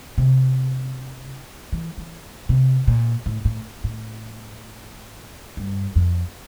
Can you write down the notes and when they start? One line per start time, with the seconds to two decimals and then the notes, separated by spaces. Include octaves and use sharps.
0.18 C3
1.72 E3
1.98 E3
2.49 C3
2.87 A#2
3.26 A2
3.45 A2
3.84 A2
5.57 G2
5.96 F2